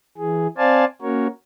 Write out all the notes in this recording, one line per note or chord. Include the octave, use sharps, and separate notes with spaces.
E3 G#4
C4 C5 D5 F5 G#5 A5
A#3 C#4 F#4 A#4 C#5